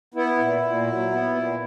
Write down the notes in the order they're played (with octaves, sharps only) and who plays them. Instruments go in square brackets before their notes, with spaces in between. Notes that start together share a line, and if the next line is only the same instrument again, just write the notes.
[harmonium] B3 E4
A#2
A#2
F#3
B3
A#2